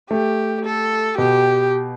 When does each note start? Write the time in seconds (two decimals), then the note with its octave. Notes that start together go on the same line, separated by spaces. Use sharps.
0.10 A3 G4
0.65 A4
1.18 B2 G4